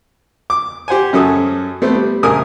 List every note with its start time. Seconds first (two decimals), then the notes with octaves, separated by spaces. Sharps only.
0.50 D6
0.88 G4 C5 F#5 G#5
1.13 F#2 C#4 F#4 A4 D#6
1.82 A3 B3 C4
1.95 G3
2.23 A#1 C#3 A#4 G#5 D#6